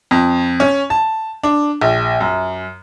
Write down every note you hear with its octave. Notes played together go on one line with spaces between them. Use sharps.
F2
C#4
A5
D4
A#1
F#2